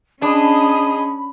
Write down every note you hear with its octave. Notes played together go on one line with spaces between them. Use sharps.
C#4 D4 G#4 D#5 B5